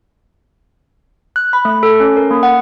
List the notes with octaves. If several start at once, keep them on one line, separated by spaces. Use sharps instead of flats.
F#6
B5
A3
A4
C#4
A#4
A#3
F#5